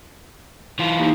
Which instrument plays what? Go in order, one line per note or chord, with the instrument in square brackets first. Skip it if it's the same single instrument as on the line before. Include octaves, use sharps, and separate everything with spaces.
[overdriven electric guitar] E3 F4
[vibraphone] A#3 D#4 G4